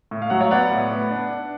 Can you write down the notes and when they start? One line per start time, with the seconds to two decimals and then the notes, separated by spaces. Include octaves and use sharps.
0.11 A2
0.22 F5
0.30 F#3 F#5
0.40 C#5 F5
0.51 B3 D5 F#5
0.71 A2
0.91 B3
1.11 D4
1.31 D4